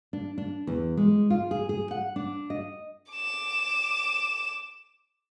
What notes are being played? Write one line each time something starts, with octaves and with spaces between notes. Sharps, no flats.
D4
D4
E2
G#3
F4
G#4
G#4
F#5
D4
D#5
D6 E7